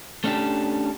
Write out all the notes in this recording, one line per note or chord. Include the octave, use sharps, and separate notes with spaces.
A3 C#4 D4 G4 A4